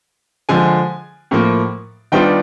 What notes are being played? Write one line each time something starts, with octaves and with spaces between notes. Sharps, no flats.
D3 F3 G#3 G#5
A2 F3 A#3
D#3 G3 B3 D4 F4 G5